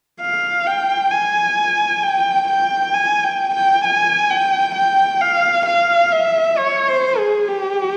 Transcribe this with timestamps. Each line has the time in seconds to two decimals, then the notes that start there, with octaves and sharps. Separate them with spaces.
0.21 F5
0.66 G5
1.11 G#5
2.02 G5
2.48 G5
2.94 G#5
3.24 G5
3.55 G5
3.84 G#5
4.30 G5
4.75 G5
5.21 F5
5.66 F5
6.12 E5
6.57 C#5
6.88 C5
7.18 G#4
7.48 G4